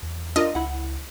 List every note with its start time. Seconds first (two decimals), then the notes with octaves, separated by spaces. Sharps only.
0.02 E2
0.36 D4 F4 A#4 D#5
0.55 C#2 E4 F#5